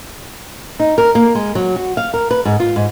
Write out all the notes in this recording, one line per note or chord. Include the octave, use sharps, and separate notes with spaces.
D#4
A#4
A#3
G#3
F#3
F#4
F5
A#4
B4
G#2
F4
G#2